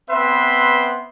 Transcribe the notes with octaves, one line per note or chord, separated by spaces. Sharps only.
B3 C4 B4 E5 C6